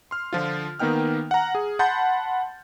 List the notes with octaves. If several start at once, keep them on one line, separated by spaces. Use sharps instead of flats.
C6 F6
D3 F3 F4
D#3 A#3 B3 D#4 G5 F6
F#5 A#5
G#4
F#5 A5 B5 C6 G6 A6